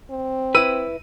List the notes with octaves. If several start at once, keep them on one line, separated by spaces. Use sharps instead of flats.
C4
E4 B4 E6 D#7